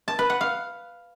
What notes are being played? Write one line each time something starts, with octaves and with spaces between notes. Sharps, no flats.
A5
B4
F#5
F5